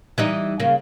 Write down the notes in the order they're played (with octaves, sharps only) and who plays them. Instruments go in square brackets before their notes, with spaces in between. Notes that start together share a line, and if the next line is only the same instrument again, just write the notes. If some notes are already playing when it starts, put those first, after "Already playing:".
[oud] E3 G3 D#4
C#3 A#3